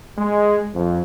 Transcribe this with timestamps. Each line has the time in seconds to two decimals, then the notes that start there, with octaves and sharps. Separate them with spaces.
0.19 G#3
0.74 F2